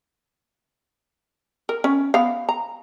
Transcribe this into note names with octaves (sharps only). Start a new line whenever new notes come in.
A#4
C#4
B3 F5
A#5